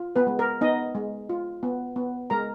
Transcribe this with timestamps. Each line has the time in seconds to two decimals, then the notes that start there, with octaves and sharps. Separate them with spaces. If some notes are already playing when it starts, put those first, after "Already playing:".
Already playing: F4
0.16 B3 B4
0.27 G#3
0.39 A#4
0.61 B3 D#4 D#5
0.95 G#3
1.29 F4
1.63 B3
1.96 B3
2.30 G#3 A#4 A#5